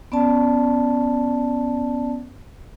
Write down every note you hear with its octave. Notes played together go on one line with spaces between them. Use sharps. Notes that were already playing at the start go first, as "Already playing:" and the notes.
B3 C#4 D5 A5